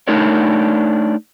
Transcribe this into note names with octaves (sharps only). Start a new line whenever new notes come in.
A3 D4 D#4 A#4 C#5 D5